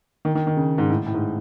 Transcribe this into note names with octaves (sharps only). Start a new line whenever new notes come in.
D#3
D#3
D#3
C#3
G#2
A2
A2
G#2